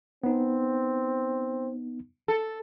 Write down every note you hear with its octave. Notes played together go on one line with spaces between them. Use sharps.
B3 C4 D#4
A4